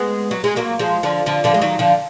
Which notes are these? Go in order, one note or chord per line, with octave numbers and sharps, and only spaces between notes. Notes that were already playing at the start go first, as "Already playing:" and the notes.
Already playing: G#3 B3
F#3
G#3
F#3 A#3
F3 G#3
D3 F3
D3 F3
D3 F3
G#3
D#3 F#3
D3 F3